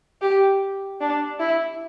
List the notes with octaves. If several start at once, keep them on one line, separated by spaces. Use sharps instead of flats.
G4
D4
E4